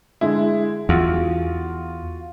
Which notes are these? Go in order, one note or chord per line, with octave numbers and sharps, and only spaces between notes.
D3 G#3 E4
E2 F4 F#4